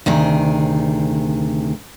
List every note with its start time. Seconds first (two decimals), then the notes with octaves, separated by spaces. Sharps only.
0.06 D2 C3 D#3 G#4